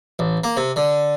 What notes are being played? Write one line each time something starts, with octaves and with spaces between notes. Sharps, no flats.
A1
A#3
C3
D3